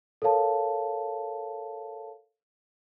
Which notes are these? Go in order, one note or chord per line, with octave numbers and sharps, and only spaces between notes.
A4 A#4 C#5 F5 A5